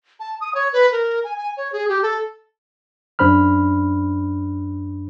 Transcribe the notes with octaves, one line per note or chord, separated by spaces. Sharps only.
A5
D#6
C#5
B4
A#4
G#5
G#5
C#5
G#4
G4
A4
F#2 D4 C5 B5 F6